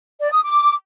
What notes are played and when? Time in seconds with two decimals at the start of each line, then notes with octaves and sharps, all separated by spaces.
0.21 D5
0.32 D#6
0.43 D6